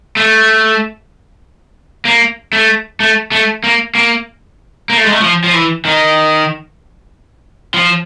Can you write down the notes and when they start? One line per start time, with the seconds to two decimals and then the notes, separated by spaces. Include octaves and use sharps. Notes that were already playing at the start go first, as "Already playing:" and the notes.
0.17 A3
2.05 A#3
2.53 A3
3.00 A3
3.32 A3
3.64 A#3
3.95 A#3
4.90 A#3
4.97 A3
5.05 G#3
5.12 A3
5.21 F3
5.44 F3
5.53 E3
5.85 D#3
7.74 F3